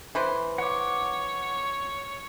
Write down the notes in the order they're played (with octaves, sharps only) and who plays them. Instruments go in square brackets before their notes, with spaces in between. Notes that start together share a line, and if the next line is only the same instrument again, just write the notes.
[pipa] E3 B4 C5
[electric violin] C#5 [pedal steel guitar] F#5 D6